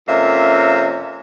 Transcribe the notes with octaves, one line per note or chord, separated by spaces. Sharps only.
F2 C3 A#3 C#4 E5